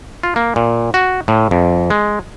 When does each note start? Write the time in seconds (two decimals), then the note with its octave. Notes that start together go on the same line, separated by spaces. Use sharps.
0.23 F4
0.36 A#3
0.56 A#2
0.94 F#4
1.28 A2
1.51 F2
1.90 G#3